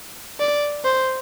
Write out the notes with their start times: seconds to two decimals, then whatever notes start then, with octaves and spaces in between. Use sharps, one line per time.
0.40 D5
0.85 C5